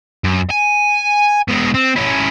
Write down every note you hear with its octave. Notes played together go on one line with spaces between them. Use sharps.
F#2
G#5
B2 G#3
C4
C#4 E4